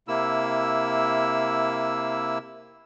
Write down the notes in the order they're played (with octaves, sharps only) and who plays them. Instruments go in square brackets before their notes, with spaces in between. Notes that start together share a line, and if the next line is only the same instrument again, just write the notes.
[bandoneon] C3 A#3 E4 E6